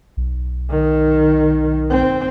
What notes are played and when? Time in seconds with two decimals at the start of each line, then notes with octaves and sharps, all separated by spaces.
0.17 B1
0.70 D#3
1.90 C4